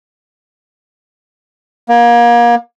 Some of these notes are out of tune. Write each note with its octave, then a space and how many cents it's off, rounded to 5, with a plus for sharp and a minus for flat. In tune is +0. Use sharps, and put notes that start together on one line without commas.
A#3 +30